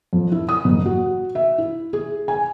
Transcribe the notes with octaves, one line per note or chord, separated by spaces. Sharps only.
F2
E4
D#6
F#1
F#4
E5
E4
G#4
G#5